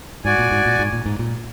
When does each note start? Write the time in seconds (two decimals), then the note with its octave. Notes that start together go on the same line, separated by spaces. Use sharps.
0.24 G#2 F#4 D5 G#5
0.38 A#2
0.51 G#2
0.66 A#2
0.79 G#2
0.93 A#2
1.06 G#2
1.19 A#2